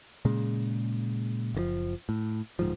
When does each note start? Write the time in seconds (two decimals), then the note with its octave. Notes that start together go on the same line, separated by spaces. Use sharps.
0.25 A#2 C#3 G#3
1.55 F#1 D3 F3
2.09 A2
2.59 D1 G#2 F3